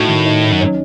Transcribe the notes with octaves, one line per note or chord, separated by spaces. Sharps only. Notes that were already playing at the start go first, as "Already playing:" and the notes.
Already playing: A2 D#4 F#4
D#3
D#4
D#4
F#2
C#4